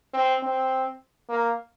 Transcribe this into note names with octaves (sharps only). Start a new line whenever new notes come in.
C4
C4
A#3